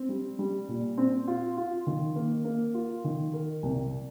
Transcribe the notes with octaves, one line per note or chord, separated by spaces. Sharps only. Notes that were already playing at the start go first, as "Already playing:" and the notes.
Already playing: C4
G3
G3
A#2
C4
F4
F4
D#3
A#3
A#3
F4
D#3
A#4
C2